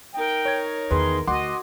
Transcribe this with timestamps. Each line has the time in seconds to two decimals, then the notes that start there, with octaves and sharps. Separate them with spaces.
0.14 D#4 A#4 G5
0.45 C#5 G#6
0.91 E2 D#3 G#4 B4 C6
1.27 D2 F#4 D#5 F#5 C6 D6